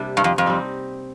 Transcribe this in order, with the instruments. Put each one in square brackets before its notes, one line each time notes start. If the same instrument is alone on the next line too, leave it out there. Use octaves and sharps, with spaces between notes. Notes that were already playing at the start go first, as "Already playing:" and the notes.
Already playing: [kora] C3 G3 A#3 D4
[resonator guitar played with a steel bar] G2
F2
F2
[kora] G3 C4 D#4